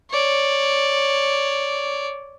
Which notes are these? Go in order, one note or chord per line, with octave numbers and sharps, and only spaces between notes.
C#5 D5